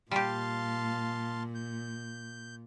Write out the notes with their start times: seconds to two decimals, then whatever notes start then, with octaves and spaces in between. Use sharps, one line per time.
0.11 A#2 G3 G4 F5 A5 C6
1.55 G6